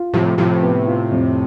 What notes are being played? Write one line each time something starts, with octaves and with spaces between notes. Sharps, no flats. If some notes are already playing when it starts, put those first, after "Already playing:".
Already playing: F4
A2 C3 F3
A2 C3 F3
B3
F4
F2